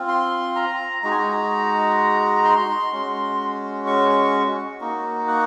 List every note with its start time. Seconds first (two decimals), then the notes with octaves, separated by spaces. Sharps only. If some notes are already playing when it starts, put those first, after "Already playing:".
Already playing: C4 F4
0.08 C6
0.56 A#5
1.03 G#3 D#4 F#4 A#5
1.11 G#5
1.18 A#5
2.45 C6
2.92 G#3 C#4 F#4
3.86 C#6
4.81 A#3 D#4 F#4
5.28 F#5